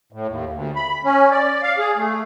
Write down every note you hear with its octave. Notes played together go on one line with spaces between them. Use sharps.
A2
D#2
D2
B5
C#4
D5
F5
G#4
A3